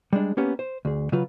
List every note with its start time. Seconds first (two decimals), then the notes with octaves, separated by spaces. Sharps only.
0.13 G3 G#3 D4
0.37 A#3 B3 C#4 G4
0.59 C5
0.85 D2 G#4
1.12 C#3 F#3 F4 B4